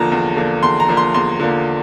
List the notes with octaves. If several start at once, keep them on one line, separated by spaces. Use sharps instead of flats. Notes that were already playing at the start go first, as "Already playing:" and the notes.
Already playing: E2 D3 F3 A#3 A5 A#5
E2
D3 F3 A#3
E2 C6
A#5
D3 F3 A#3
C6
E2 C6
D3 F3 A#3